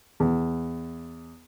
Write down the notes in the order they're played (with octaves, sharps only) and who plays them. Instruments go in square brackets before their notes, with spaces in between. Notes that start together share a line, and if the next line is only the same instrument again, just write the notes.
[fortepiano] E2